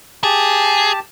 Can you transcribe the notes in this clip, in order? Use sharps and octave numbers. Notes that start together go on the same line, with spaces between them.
G4 G#4 A5